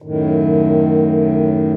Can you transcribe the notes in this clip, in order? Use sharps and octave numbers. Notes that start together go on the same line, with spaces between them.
F#2 A2 D#3